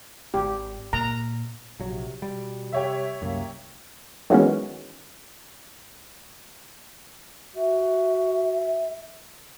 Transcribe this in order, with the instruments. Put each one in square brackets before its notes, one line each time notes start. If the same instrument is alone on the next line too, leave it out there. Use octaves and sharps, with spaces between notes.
[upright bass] G#1 [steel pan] G4
[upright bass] A#2 [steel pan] A#5
[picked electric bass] A#1 F#3 [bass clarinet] C3
[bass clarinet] B2 [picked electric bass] G3
[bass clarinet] C3 [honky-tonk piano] G4 C#5 E5
[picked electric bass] C2 F#2 [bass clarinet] A#3
[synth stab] D#3 E3 F#3 G#3 B3 C#4
[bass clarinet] F#4 [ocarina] E5